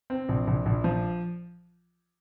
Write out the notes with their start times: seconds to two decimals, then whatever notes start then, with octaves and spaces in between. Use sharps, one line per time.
0.10 C4
0.29 A#1
0.47 A#1
0.66 A#1
0.84 F3